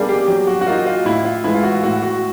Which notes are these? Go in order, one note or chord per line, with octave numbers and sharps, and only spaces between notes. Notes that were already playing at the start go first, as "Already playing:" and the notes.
Already playing: B2 G3 A#3 D4 G#4
G4
F#3 G4
F#4
F#4
A#3 D#4 F4
F4
A2 E4
F4
E3 G#3 E4
F4
F#4
A2 F#4
F#4